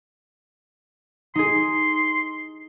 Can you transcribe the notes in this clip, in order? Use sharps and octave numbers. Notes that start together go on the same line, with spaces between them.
D#4 G#4 C6